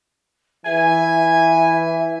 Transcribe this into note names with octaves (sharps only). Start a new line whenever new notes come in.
E3 E5 G#5